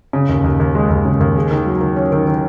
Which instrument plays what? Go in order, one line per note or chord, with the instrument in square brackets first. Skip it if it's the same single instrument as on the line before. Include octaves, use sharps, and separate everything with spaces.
[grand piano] C#3
D#2
D#2
D#2
G#3
D#2
C#3
D#2
G#4
D#3
F#3
D#3
C#4
D#3
D#3